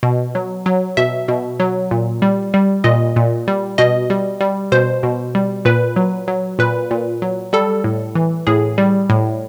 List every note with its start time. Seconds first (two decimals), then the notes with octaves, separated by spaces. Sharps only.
0.03 B2
0.35 F#3
0.66 F#3
0.97 B2 E5
1.28 B2
1.60 F#3
1.91 A#2
2.22 G3
2.54 G3
2.84 A#2 D#5
3.16 A#2
3.48 G3
3.78 B2 D#5
4.10 G3
4.41 G3
4.72 B2 C5
5.03 B2
5.35 G3
5.65 A#2 B4
5.96 F#3
6.28 F#3
6.59 A#2 B4
6.91 A#2
7.22 F#3
7.53 G3 A4
7.84 A2
8.15 E3
8.47 A2 G#4
8.78 G3
9.10 A2